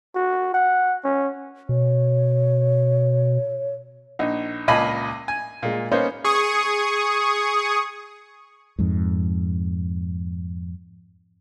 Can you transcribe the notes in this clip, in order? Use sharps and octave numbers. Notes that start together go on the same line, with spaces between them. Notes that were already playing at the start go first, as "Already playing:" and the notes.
F#4
F#5
C#4
B2 C#5
A#1 D#4
C#2 A#2 D#5 G#5 A5 B5
G#5
A#2 G#3
A#3 B3 C#4 D#4 C5 C#5
G#4 C#6 D#6
F2 G#2